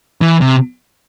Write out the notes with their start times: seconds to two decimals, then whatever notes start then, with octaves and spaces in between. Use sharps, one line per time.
0.21 E3
0.41 C3